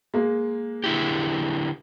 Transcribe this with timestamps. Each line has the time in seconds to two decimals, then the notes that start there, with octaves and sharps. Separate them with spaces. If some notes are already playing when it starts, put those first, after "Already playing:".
0.14 G#3 A#3
0.84 D3 E4 G4